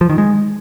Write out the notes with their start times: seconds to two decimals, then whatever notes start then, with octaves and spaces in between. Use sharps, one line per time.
0.01 F3
0.09 D#3
0.18 G#3